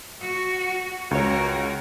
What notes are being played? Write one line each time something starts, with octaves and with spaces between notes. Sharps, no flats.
F#4
C#2 F#4 A#4 C#5